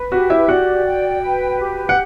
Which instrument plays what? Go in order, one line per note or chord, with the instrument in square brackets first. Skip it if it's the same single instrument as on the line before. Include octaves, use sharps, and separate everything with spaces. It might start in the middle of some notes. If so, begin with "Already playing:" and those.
Already playing: [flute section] B4
[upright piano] F#4 [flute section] G4
[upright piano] E4 E5
[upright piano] F#4 F#5 [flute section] D5
[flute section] G5
B4
G4
[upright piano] F#5